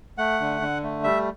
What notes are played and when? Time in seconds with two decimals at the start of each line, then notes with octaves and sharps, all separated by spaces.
0.18 A3 F#5
0.40 D3
0.61 D3
0.83 A3
1.04 G3 E5